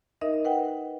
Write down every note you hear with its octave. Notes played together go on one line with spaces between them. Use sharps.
D#4 A#4 D#5 E5
B4 F#5 G5